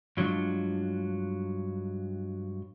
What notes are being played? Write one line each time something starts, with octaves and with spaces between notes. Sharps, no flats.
G2 F#3 G#3 D4 F4